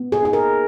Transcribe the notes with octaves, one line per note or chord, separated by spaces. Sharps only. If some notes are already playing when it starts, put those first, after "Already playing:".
Already playing: B3
G#4
D#4 G#4
A#4